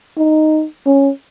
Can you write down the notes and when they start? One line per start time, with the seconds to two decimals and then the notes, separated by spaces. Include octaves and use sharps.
0.18 D#4
0.86 C#4